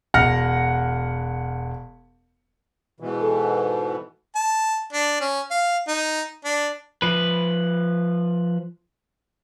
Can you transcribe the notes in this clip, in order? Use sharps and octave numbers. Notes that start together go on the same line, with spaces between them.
E1 F#5 F6 A#6
G#2 B2 E3
A4
A5
D4
C#4
F5
D#4
D4
F3 B4